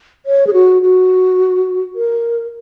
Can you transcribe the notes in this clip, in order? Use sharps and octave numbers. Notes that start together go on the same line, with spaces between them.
C#5
G#4
F#4
F#4
A#4